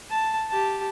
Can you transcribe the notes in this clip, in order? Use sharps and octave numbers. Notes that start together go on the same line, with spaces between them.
A5
G4 A5